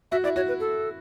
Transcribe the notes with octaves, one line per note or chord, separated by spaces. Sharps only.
F#4 E5
E4 D5
F#4 C#5
B4
A4